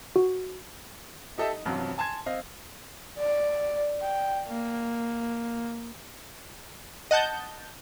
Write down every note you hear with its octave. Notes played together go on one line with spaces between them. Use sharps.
F#4
D#4 G4 A4 D#5 E5
D#4
A1 G2 C3 F3 F#3
G#5 A5 C6 G#6
C4 D#5 F5
D5
G5
A#3
D#5 F#5 A5 G6